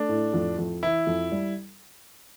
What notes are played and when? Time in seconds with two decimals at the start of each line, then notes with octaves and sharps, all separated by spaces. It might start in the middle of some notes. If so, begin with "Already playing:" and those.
Already playing: A3 D4
0.09 A2
0.34 F2
0.58 F2
0.83 E3 E4
1.07 F2
1.32 G3